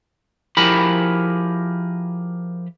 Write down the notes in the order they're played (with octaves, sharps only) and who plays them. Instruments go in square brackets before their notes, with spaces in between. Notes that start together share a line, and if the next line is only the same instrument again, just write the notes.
[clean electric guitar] F3 E4 G4 G#4 A#4 B5